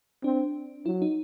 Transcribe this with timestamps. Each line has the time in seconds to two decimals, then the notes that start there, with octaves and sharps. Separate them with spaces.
0.24 C4 D4
0.86 F#3 E4
1.02 D#4